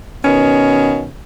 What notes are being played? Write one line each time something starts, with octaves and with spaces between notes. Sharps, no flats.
B2 D#3 B3 C#4